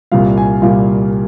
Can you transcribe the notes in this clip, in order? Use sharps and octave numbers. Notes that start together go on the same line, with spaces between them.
C2 A#2 G3 F5
G#5
C2 A#2 G3 F5